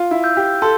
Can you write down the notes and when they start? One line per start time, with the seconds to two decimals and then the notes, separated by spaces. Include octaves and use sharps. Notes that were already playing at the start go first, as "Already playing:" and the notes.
Already playing: F4
0.11 E4
0.24 E6 G6
0.37 G4
0.62 A4 C6